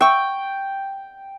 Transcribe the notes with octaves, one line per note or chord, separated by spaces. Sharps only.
E5 G5 C#6